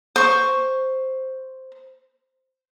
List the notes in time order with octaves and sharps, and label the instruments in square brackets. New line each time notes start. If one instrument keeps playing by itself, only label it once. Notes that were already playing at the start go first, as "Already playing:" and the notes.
[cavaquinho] C5 C#6